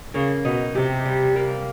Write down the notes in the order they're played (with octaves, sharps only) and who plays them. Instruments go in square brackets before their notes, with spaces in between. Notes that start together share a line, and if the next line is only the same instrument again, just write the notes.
[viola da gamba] C#3 [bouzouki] A#3
[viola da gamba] B2 [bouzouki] D#4
[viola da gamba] C3 [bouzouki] G4
[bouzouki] G3
A#3